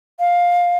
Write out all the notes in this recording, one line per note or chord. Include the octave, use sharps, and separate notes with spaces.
F5